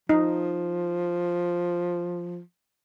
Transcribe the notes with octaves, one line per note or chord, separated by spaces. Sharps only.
F3 D#4